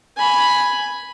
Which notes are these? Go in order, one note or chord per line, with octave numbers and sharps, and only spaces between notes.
G#5 B5